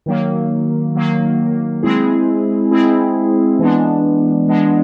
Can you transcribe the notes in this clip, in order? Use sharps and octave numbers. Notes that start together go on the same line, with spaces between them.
D#3 F#3 A#3
D#3 F#3 A#3
G#3 C4 E4 G#4
G#3 C4 E4 G#4
E3 G#3 B3 D4
E3 G#3 B3 D4